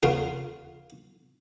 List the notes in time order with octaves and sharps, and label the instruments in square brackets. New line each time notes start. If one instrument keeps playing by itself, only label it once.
[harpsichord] D#2 C#3 F4 F#5